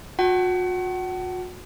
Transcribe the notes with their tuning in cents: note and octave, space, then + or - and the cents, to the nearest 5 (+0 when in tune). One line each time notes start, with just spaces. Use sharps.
F#4 -40 F#5 +35 A5 +0